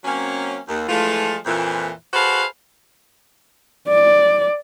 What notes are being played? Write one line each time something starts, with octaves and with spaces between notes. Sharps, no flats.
F#3 A#3 C4 C#4
D#2
E3 F3 G#3 A3 F4
F2 A#2 E3
F#4 G#4 A4 B4 C5 F5
D5